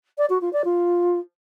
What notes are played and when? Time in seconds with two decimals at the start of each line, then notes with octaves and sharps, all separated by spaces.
0.18 D5
0.30 F#4
0.41 F4
0.53 D5
0.65 F4